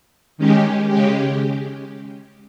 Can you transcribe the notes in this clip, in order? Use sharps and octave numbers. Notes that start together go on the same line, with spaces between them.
D#3 G#3 C#4 G4
C#3 G#3 C#4 G4